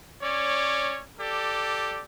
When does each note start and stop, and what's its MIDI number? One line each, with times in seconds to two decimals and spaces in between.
0.21 1.01 61
0.21 1.01 73
0.21 1.01 74
1.19 2.02 67
1.19 2.02 69
1.19 2.02 74